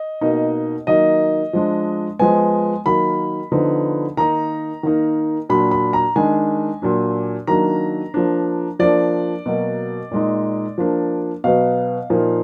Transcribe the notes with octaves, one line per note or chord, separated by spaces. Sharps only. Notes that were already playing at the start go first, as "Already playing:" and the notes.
Already playing: D#5
B2 A#3 D#4
D#3 F#3 A#3 D#4 D#5
F3 G#3 D4
F3 G#3 B3 G#5
D#3 F#3 A#3 B5
D3 F3 B3 D#4
D#3 A#3 D#4 A#5
D#3 A#3 D#4
A#2 F#3 D4 B5
B5
A#5
D#3 G#3 D4 G#5
A#2 F#3 D4
D#3 F#3 A#3 D4 A#5
F3 A#3 D4
F3 A#3 D4 D5
B2 F#3 A#3
A#2 G#3 D#4
F3 A#3 D4
B2 F#3 B3 F5
A#2 F3 A#3 D#4